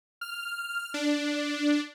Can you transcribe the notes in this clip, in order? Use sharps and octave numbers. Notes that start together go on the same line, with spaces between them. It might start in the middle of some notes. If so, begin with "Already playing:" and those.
F6
D4